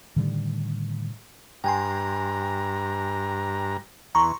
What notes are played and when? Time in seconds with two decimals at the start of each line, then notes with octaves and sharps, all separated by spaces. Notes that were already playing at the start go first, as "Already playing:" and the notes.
0.16 A2 D3 D#3 G3
1.64 G2 G5 G#5 A#5 C6
4.15 E2 A#5 C6 C#6